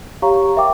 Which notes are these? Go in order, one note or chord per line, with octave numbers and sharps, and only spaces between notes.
G4 C#5 F5 A#5 C#6
A#4 E5 G5 D6